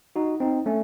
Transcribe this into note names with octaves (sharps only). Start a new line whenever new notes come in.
D#4 F#4
C4 D#4
A3 C#4